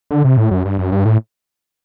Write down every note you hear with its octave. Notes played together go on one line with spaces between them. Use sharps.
D3
C3
A2
F#2
G2
F#2
G2
A2